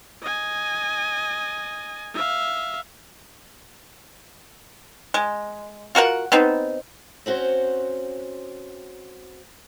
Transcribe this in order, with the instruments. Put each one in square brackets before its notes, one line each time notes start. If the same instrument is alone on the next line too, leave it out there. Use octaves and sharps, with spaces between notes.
[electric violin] D#5 G#5
E5 F5
[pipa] G#3
F4 F#4 A#4 F#5
B3 C4 D#4
[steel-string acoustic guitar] C4 C#4 F#4 C5